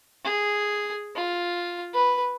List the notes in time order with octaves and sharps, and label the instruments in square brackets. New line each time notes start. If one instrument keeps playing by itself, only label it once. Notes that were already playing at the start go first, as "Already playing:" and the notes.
[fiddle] G#4
F4
B4